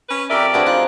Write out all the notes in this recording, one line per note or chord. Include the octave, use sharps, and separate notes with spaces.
C#4 B4
F2 G4 A#4 D5 E5
C4 D4 F#4 G#4 B4
D#4 F4 F#6